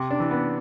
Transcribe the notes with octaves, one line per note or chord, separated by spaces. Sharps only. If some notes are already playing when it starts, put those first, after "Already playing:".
Already playing: C3
D4
E3
B3